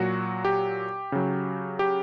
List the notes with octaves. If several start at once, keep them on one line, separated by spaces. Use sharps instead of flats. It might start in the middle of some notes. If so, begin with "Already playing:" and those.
Already playing: A#2 F#3 F#4
G4
C#3 F#3
G4